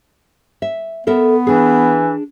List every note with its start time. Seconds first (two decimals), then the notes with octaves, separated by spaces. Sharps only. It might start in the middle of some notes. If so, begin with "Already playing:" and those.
0.62 E5
1.07 B3 A4 A#4 E5
1.47 E3 D4 G#4